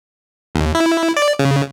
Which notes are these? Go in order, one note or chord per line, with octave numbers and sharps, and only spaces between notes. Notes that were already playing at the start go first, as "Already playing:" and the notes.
D#2
E4
D5
C#3